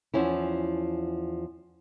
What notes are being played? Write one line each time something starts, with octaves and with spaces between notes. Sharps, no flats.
E2 F3 C#4 E4